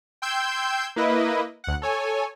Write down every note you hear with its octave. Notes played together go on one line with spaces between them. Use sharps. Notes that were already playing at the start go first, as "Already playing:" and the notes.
G5 C6 E6 G6 G#6
A#3 E4 B4 D#5
D2 F#5
A4 C#5 G#5